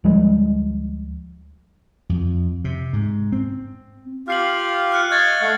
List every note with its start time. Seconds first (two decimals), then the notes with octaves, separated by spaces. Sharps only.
0.04 D2 F3 G3 G#3
2.09 F2
2.64 C3
2.93 G#2
3.32 C4
4.28 F4 G4 F5 F6 C7 F#7
4.92 F6 F#6 C#7
5.11 D#5 F5 C#6 F6 G#6 A6
5.42 A3 F5 F#5